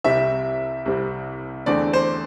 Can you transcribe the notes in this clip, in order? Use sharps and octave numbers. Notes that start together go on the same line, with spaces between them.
C2 C3 G3 C4 E5
C2 C3 G3 C4
E2 D3 A3 C4 D5
C5